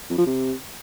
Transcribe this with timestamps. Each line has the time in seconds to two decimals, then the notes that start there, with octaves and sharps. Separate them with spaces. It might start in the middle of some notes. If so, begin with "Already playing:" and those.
0.10 F2
0.18 F3
0.26 C3